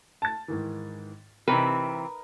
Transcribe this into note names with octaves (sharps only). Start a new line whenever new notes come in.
A5 A6
G#2 D#3 E3
C3 E3 C4 D#4 A#4 B4